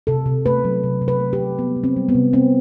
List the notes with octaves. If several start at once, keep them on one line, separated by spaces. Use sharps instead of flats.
C3 A4
C3
A3 B4
F#3
C3
C3
B4
A3
G4
F#3
G3 B3
C3
C4
G3
B3
C3
B3 C4